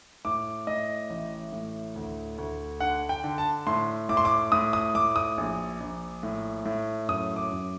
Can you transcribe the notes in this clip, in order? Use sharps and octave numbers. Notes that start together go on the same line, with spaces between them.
A2 D6
A2 D#5
A1
A2
D2
D2
D3 F#5
G5
D3
A5
A2 C6
A2 D6
C6
D6
A2 D#6
D#6
A2 D6
D#6
A#1
A#1
A2
A2
F#2 D#6
D6
F#2